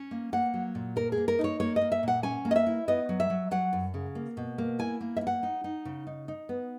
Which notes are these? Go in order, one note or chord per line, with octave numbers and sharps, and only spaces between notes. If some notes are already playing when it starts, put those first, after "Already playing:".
Already playing: C#4
A#3
A#3 F#5
F#3
A#2
A#3 A#4
G#4
A#3
A#4
D#4
C#5
A#3 C#5
D#5
A#3
E5
A#2 F#5
C#4 G#5
A#3
D#5
E5
E4
B3 D#5
F#3
E5
F#3
F#3 F#5
F#2
C#3
A#3
B2
A#3
E4 G#5
A#3
E5
E4
F#5
D#4
D#4
C#3
D#4
D#4
B3